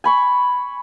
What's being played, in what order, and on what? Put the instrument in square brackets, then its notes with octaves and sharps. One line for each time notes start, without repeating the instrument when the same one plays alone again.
[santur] G#5 B5 C#6